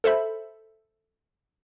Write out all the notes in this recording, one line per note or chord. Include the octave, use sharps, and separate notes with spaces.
A4 C5 E5 B5